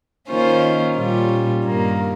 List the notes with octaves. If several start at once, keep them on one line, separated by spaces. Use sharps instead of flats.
D#3 A#3 C#4 F4 C5
A#2 G3 C#4 F4
G2 D#3 A#3